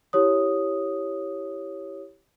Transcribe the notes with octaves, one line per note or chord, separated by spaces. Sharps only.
E4 G4 C#5 D#6